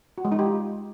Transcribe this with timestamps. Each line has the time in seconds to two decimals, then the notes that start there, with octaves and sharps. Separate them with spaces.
0.18 F#4
0.25 G#3
0.32 D#4
0.39 G4
0.46 F4